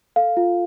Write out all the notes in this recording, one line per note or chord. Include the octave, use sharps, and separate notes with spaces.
A4 F5
F4